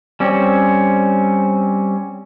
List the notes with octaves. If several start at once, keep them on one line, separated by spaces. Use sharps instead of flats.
G3 C4 C#4